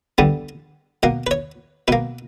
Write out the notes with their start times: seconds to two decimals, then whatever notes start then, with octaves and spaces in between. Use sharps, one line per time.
0.18 G2 D3 G3 B3
1.03 B2 A#3 F#5
1.27 B4
1.31 C#5
1.88 B2 A#3 B4